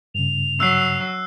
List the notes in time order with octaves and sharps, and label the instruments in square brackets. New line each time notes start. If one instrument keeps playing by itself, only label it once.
[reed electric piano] G2 C#3 [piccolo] F7
[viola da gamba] F#3 [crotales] E6 F#6 C7